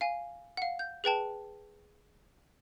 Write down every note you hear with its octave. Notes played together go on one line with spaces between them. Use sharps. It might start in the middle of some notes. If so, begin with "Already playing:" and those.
F5 G#5
F5 F#5
G6
G#4 B4 G5 A5